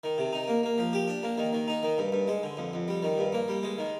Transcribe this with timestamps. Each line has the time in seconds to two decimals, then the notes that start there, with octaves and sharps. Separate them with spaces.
0.04 D#3
0.18 C3
0.33 D#4
0.48 A#3
0.63 A#3
0.78 F3
0.93 G4
1.08 D4
1.23 A#3
1.38 D#3
1.53 D#3
1.68 D#4
1.83 D#3
1.98 G2
2.12 G2
2.28 G#3
2.43 D3
2.57 F2
2.73 F2
2.88 G3
3.03 D#3
3.18 G2
3.33 A#3
3.48 G3
3.63 G#3
3.78 D#3